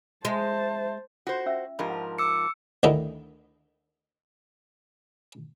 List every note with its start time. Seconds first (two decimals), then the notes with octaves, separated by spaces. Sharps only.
0.25 G#3 C5 E5 A5
1.27 F4 F#4 C5
1.46 C#4 E5 E6
1.79 G#2 F3 D4 G4 A#4 B5
1.90 F#5 A5
2.19 D6 E6 C#7
2.83 D2 D3 D#3 A3 D#4 E4